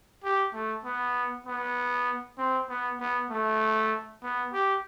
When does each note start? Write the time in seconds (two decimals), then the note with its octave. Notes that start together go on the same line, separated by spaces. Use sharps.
0.24 G4
0.54 A3
0.85 B3
1.47 B3
2.38 C4
2.69 B3
3.00 B3
3.30 A3
4.23 B3
4.53 G4